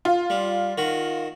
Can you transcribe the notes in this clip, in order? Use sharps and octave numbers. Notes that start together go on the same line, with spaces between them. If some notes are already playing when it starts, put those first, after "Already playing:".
F4
G3
D#3 F#4